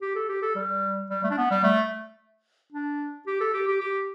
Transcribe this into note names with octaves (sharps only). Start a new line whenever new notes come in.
G4
A4
G4
A4
G3
G3
A3
D4
B3
G3
A3
D4
G4
A4
G4
G4
G4